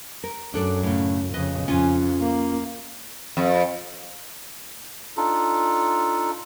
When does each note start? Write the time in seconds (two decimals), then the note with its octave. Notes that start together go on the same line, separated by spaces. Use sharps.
0.24 A#4
0.54 F#2 D4 A4 D5
0.83 A2 C#3
1.33 F2 C#3 B4 D#5
1.68 F2 C#4 F4 G#5
2.21 A#3
3.37 F2
5.17 D4 D#4 F4 A4